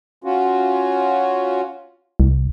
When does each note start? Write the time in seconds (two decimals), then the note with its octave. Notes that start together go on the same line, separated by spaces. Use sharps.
0.24 C#4 F4 F#4
2.20 C2